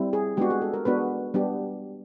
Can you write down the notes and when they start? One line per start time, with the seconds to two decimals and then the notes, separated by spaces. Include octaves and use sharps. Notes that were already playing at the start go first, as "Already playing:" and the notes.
Already playing: G3 C4 E4
0.13 G#4
0.37 G#3 B3 D4 F#4 G4
0.50 G#4
0.62 A4
0.73 A#4
0.85 G#3 B3 D4 F#4 B4
1.34 G3 B3 D4 G4